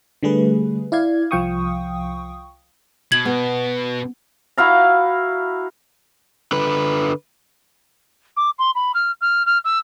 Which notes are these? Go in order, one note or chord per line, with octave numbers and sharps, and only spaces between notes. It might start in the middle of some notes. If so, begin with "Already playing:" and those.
D3 G3 A3 G#4 B4
E4 D5 F5 G#6
C2 F3 F5 G5 C#6 D#6
B2 G#6 F#7
B3
E4 F#4 F5 A#5
D3 B4
D6
C6
B5
F6
F6
F6
E6